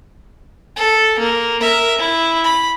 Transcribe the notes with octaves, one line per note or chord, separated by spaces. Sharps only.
A4
A#3
A#4 E5
E4
B5